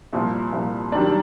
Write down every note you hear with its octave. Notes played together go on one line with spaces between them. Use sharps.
C2 A#2 F3
C2 A#2 F3
F#2 D#3 G3 D4